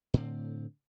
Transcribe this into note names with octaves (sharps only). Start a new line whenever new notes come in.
A2 D3 C4